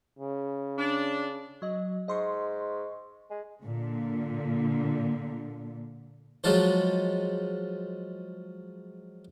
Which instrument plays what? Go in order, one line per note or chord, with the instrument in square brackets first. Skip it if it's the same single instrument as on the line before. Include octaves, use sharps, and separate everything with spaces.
[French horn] C#3
[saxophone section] D4
[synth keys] F#3 D#5
[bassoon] G#2 [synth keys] D#5 C6 C#6
[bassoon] G#3
[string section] A#2 D3
[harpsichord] F3 F#3 G#3 F4 A4 C5